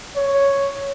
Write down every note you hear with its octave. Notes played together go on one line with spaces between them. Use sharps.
C#5